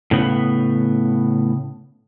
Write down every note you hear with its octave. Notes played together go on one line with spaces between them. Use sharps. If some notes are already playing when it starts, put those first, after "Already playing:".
A2 C#3 B3